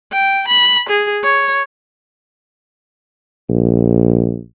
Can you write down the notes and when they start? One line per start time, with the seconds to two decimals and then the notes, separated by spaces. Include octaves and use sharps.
0.12 G5
0.48 B5
0.89 G#4
1.23 C#5
3.49 A#1